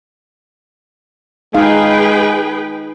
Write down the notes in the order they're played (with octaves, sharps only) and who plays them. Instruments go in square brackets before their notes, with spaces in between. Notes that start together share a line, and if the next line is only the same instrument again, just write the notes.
[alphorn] G#3 [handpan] D#4 F5 [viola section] G#4 B4 G5